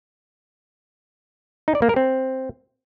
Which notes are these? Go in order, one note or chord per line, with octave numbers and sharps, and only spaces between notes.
D#4
D5
A#3
A#4
C4